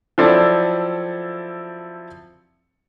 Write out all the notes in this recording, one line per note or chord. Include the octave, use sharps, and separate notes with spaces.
F3 F#3 C4 E4 A4 D5